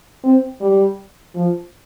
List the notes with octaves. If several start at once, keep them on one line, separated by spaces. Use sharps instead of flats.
C4
G3
F3